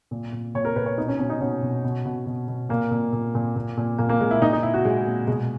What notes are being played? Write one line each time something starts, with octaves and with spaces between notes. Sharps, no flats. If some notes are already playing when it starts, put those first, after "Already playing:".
A#2
A#2
A#2 C#5
A#4
A#2 B4
C#5
B2 D#4
C#4
B2 C#4
D#4
B2 C#4
B2
B2
B2
B2
B2
A#2 A#3
A#2
A#2
A#2
A#2
A#2
A#2 A#3
A#3
A#2 G#3
E4
A#2 D#4
D#4
A#2 E4
F#4
A#2 G#3
A#2
B2 G#3